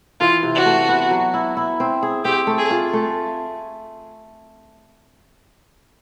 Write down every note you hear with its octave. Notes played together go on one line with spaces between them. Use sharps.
E3 F4
C3
F#4
A3
B3
F#3
E4
E4
C4
G#4
C4 G4
A3
G#4
F4
A3